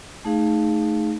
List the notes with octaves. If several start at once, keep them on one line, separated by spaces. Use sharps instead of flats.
A3 D#4 G#4 F5